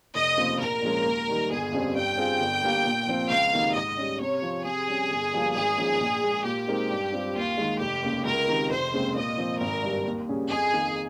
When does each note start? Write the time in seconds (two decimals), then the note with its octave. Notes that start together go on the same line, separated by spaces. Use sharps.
0.15 F1 D#5
0.37 D#2 C#3 F3 C4
0.60 A#1 A#4
0.82 A#2 F3 G#3 C#4
1.05 D#2
1.28 D#3 G3
1.50 G1 G#4
1.72 F2 C#3 G3 C4
1.94 G2 G5
2.17 G3 C4 F4 G#4
2.40 G1
2.62 G2 G3 A#3
2.85 A#2
3.07 F3 C4 F4
3.29 C#2 F5
3.53 C3 D#3 A#3 D#4
3.74 G#2 D#5
3.97 G3 C#4
4.20 C3 C#5
4.42 F3 C4
4.64 C3 G#4
4.87 G3 C#4
5.10 G1
5.33 G2 F3 A#3
5.55 G#1 G#4
5.77 G#2 F3 A#3 C#4
6.00 A#1
6.23 A#2 G#3
6.45 A#2 G4
6.67 G#3 C4 D#4 A#4
6.90 G2
7.12 G3 C4 F4
7.35 D#2 F4
7.57 D#3 G#3
7.80 F1 G4
8.03 D#2 C#3
8.25 C#2 A#4
8.48 C3 D#3
8.70 F1 C5
8.92 D#2 C#3 G#3 C4
9.15 A#2 D#5
9.37 F3 C4
9.60 G#1 A#4
9.82 G2 G3
10.05 D#2
10.28 C#3 G3 C#4 G#4
10.50 F2 G#4
10.73 D#3 A#3